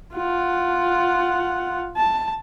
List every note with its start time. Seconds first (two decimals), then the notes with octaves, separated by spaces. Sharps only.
0.14 F4 F#5
1.96 A5